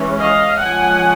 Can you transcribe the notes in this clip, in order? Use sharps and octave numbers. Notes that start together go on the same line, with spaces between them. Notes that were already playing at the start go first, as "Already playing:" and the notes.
Already playing: E3 G#3 C#4
D#5 F5
F3 G#3 C#4 F#5 G#5